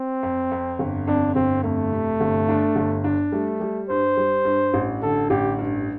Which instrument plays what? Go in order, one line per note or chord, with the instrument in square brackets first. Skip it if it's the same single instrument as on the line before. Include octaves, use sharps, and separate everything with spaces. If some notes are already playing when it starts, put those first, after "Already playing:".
Already playing: [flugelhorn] C4
[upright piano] F2
F2
G1
[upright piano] F2 [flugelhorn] D4
[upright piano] G1 [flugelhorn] C4
[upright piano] F2 [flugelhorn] A3
[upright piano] C3
G1
D4
G1
D4
[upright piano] G3 [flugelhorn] A3
[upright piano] G3
[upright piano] G2 [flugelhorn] C5
[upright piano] G3
G2
A1
[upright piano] D3 [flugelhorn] A4
[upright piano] A1 [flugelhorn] G4
[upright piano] G2